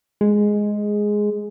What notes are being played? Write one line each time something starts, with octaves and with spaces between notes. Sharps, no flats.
G#3